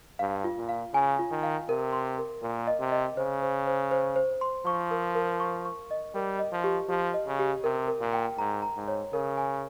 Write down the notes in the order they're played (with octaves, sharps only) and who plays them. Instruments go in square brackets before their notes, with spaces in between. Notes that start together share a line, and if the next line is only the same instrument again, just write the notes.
[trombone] G2 [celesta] F5
[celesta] F4
[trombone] A#2
[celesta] F5
[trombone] C#3 [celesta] G#5
[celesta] F4
[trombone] D#3
[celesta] F5
[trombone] C3 [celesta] A#4
[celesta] C6
A#4
[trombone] A#2 [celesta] A#4
[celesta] D#5
[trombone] C3
[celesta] D#5
[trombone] C#3 [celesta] C5
[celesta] C5
C5
C5
C5
C6
[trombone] F3 [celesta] C#6
[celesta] A#4
A#4
C#6
C#6
D#5
[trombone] G3 [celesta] A#4
[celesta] D#5
[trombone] F3
[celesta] G4
[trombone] F3 [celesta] G4
[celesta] D#5
[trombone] C#3
[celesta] G4
[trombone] C3 [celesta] A#4
[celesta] A#4
[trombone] A#2
[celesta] G5
[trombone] G#2 [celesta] A#5
[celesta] A#5
[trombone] G#2
[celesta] C#5
[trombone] C#3 [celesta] A#4
[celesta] G#5